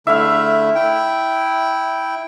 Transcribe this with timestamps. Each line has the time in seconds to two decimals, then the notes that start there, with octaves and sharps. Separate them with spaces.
0.07 D3 A3 E4 E5 F5
0.75 E4 G5